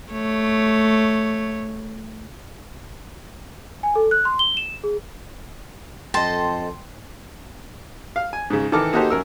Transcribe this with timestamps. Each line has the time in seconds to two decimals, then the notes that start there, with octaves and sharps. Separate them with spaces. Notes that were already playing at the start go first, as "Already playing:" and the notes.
0.11 A3 C#5
3.83 G#5
3.96 A4
4.11 F#6
4.25 C6
4.39 G7
4.57 E7
4.84 G#4
6.14 F2 A4 D#5 G5 A5 C6
8.16 F5
8.33 G#5
8.50 G#2 C#3
8.72 D#3 E3 A4 D6 F6
8.93 A#3 D#4 F#4 G4 A4 C5
9.10 F#2 A#4 E6